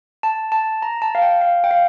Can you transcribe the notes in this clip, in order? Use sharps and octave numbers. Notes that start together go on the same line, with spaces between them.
A5
A5
A#5
A5
F5
G5
F5
G5
F5